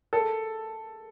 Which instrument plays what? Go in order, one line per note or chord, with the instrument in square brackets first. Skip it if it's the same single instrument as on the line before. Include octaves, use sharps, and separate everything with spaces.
[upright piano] A4